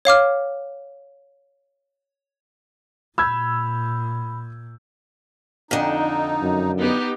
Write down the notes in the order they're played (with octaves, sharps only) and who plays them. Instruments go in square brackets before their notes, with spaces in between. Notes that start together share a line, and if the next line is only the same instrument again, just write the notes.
[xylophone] C#5 F5 D6 F6
[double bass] A#2 [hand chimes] B5 [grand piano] E6 G6 G#6
[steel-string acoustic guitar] F2 D3 [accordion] D#4
[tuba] F#2
[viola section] B3 D#4 G4